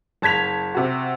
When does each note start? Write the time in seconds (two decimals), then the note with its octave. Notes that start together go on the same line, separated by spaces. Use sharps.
0.22 F#1 A5 G#6 B6 F7
0.75 C3 F#4